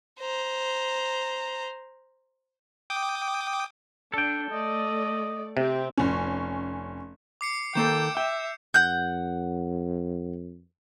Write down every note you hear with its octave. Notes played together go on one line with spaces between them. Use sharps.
C5 A#5
G5 D6 D#6
D4 A4 G5
A3 D5 D#5
C3 C4 G4
F1 C#4
D6 C7 C#7
D#3 A#3 A4 G5 G6 E7
E5 G5
F2 F#5 G6